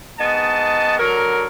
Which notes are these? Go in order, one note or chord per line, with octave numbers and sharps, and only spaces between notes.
G#2 B3 D#5 A5
D3 F#3 A#4